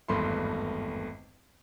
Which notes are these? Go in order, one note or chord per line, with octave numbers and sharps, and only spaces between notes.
G#1 E2 G2 A3 B5 C6